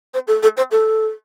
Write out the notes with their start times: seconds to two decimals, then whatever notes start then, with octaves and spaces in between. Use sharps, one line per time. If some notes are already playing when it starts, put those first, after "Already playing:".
0.14 C5
0.27 A4
0.43 A4
0.57 C5
0.71 A4